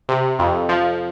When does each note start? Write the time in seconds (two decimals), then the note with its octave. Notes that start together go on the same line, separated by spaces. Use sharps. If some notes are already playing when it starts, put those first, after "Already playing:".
0.09 C3
0.39 F2
0.69 F3